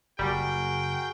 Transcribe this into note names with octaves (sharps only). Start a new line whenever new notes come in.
F#1 G3 F#4 G#4 A#4 G5